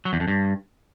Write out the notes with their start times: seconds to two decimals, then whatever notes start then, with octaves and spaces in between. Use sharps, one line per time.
0.05 F#3
0.13 E2
0.20 F2
0.28 G2